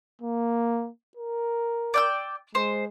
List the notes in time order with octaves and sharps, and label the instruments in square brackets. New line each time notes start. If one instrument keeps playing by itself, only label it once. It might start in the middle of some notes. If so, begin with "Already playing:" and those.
[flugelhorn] A#3
A#4
[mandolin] D5 G5 E6
[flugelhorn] G#3 [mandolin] C5